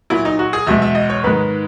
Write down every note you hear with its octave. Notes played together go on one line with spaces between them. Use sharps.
A#2 F#3 E4
D#4
F#4
G#4
E2 B2 G#3 E5
E5
D#5
C#5
G#2 D#3 G#3 B4